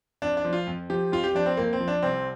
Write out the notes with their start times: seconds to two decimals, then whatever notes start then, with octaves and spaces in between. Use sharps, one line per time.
0.22 F2 D4
0.37 D4
0.45 F3
0.53 F4
0.67 F2
0.90 F3 G4
1.12 F2 F4
1.24 G4
1.35 F3 D4
1.46 C4
1.57 F2 A#3
1.73 C4
1.81 F3
1.88 D4
2.03 C2 C4